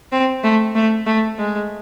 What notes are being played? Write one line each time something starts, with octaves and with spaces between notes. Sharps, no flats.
C4
A3
A3
A3
G#3